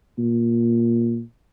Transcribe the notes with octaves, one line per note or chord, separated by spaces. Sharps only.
A#2